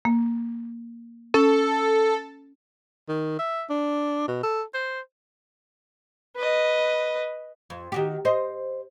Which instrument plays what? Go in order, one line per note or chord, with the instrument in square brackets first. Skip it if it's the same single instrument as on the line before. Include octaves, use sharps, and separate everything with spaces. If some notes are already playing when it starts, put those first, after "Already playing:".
[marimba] A#3
[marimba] C#4 [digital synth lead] A4
[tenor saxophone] D#3
E5
D4
B2
A4
C5
[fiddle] B4 D#5
[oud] F2
D#3 F#4 G4
C5 D#5